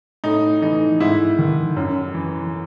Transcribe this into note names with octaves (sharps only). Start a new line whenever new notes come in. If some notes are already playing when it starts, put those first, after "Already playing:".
A2 D#4
E3 D#4
G#2 E4
D#3
F#2
E3